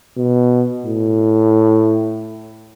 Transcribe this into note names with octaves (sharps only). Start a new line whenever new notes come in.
B2
A2